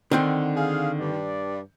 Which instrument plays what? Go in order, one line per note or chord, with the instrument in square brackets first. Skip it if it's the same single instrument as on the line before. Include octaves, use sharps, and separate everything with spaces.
[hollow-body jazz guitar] D3 C4 F#5 [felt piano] D#3
[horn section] G#4 F5
G2 D5